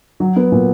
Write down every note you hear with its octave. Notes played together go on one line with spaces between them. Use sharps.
F#3
B3
A#2